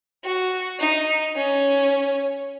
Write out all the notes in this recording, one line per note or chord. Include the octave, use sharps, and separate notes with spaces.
F#4
D#4
C#4